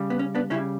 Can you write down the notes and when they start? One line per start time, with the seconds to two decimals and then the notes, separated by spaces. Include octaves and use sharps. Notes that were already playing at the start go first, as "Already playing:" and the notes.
Already playing: C#3 G3
0.10 B3
0.19 C#4
0.35 B3 D4
0.50 C#3 G3 C#4 E4